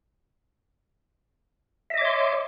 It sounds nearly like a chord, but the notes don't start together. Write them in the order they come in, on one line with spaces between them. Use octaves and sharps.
E5 D#5 D6 C#5 C6